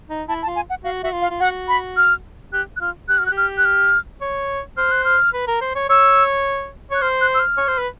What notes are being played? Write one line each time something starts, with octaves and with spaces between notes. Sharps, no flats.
D#4
E4 A5
A5
F4
G#5
F#5
F#4 F5
F#4 E5
F4
F5
F4
F#4 F#5
B5
F6
G4 F#6
F#6
F4 F6
G4 F#6
F#4 F6
F#6
G4
F6
F#6
F6
C#5
C5 F6
F#6
F6
B4
A#4
C5
C#5
C#5 E6
C#5 F#6
C5 F6
F#6
E6
F6
C#5
C5
B4